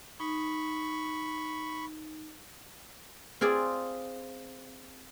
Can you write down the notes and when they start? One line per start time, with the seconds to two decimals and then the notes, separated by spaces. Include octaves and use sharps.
0.20 D#4 B5 C#6
3.41 C4 F4 G#4 D5